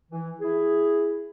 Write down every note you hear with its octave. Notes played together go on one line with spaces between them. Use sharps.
E3
E4 G#4